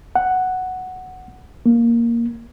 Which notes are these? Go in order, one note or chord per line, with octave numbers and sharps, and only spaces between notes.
F#5
A#3